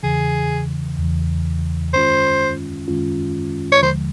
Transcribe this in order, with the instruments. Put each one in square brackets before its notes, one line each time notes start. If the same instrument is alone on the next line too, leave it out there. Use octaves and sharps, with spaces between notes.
[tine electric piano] E2 C#3 E3 [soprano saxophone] G#4
[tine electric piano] E2 C#3 E3
[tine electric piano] F#2 D#3 G#3 C#4 F4 [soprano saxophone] C5
[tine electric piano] F#2 D#3 G#3 C#4 F4
[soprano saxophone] C#5
[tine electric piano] D#2 D3 F3 G#3 [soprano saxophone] C5